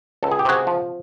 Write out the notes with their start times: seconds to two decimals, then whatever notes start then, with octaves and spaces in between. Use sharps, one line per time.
0.23 C#2 A4
0.32 G#4
0.39 G4
0.45 C3 F#4 G#4
0.67 F3